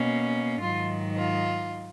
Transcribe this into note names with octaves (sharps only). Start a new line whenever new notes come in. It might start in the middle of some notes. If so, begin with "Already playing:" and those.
Already playing: B2 A#3 C#4
G#2 D#3 F#3 F4
F4